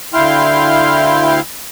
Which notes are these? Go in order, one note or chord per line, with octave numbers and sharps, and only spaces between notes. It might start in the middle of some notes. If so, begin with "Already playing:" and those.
D2 E4 F5 G5 C6 F6